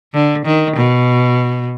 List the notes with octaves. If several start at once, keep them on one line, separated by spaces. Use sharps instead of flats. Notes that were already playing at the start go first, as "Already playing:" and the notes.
D3
D#3
B2